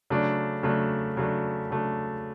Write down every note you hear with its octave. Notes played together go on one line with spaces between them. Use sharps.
C#3 F#3 A3 D4
C#3 F#3 A3 D4
C#3 F#3 A3 D4
C#3 F#3 A3 D4